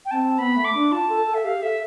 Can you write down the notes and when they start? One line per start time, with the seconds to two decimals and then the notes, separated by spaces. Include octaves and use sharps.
0.06 G5
0.11 C4 A5
0.38 B3 B5
0.56 A3
0.65 D6
0.74 D4
0.92 F4 A5
1.09 A4
1.27 A4
1.34 E5
1.44 G4 F5
1.62 A4 E5